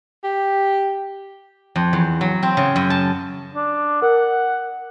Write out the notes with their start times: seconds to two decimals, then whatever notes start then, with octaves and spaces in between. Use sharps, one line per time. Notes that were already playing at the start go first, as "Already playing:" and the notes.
0.24 G4
1.76 F2
1.93 E2
2.21 F#3
2.43 C4
2.57 C#3
2.76 F#2
2.90 A5
3.54 D4
4.02 A#4 F#5